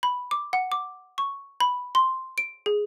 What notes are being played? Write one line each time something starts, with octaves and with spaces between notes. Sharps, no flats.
B5
D6
F#5
D6
C#6
B5
C6
D7
G#4